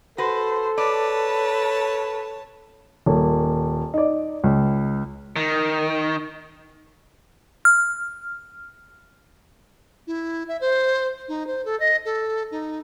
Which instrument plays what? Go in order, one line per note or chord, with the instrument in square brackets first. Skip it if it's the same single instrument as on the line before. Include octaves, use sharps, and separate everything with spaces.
[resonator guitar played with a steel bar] F#4 B4 [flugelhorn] A4 [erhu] C5
[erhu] B4 [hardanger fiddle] C#5 A5 [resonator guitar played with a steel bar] D5
[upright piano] D#1 A#3
D#4 D5
C#2
[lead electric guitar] D#3
[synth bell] F6
[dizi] E4
E5
C5
D#4
C5
A4
D#5
A4
D#4